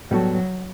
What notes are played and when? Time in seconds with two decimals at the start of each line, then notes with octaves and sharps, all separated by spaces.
0.11 A2 F#3 G3 B3 F#4 A4